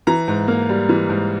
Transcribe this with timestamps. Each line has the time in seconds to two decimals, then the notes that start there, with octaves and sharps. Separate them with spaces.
0.07 E3 A#5
0.28 G#2
0.48 A#3
0.69 G3
0.89 E3
1.09 G#2